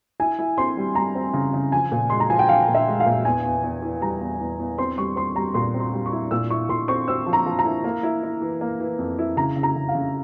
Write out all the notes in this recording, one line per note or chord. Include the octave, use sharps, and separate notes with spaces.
E4 G#5
E4
C4 C6
G3
G3 A#5
C4
C#3
C#3
F3 G#5
A#2
G#3 C6
A#5
F3 G#5
G5
F3 F5
A#2
E5
G#3
F5
A#2
E2 G#5
E2
E2
E3
G3 A#5
E2
E2
E2
C4 C6
G3 C#6
C4 C6
G3 A#5
A#2 C6
C4
C6
G3
C#6
E4
A#2 E6
E4 C#6
A#2 C6
C4 C#6
C4 E6
F3
A#5
F3
A#5
E4
A#3
E4
E4
E3
A#3
E3
F2
E4
C#3 A#5
C#3
A#5
C#3
F5
C#3